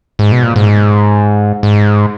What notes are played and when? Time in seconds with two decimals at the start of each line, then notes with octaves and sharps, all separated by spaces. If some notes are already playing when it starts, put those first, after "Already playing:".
0.19 G#2
0.32 B2
0.43 A#2
0.56 G#2
1.63 G#2